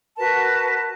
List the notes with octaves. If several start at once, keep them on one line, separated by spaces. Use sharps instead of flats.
F#4 A#4 B4 A5